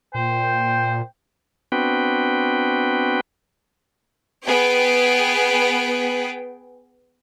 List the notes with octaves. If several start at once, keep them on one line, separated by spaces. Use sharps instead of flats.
A#2 C5 G5
B3 C4 D4 F#4 B4 G5
B3 G#4 G5